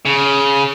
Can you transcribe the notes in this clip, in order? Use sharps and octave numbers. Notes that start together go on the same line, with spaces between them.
C#3